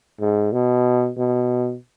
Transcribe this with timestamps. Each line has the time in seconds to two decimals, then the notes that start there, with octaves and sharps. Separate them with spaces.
0.21 G#2
0.53 B2
1.17 B2